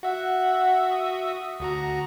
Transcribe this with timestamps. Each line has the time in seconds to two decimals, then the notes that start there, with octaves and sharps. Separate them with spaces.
0.03 F#4 E5 F#5
0.91 D#6
1.60 D2 F#4 A#5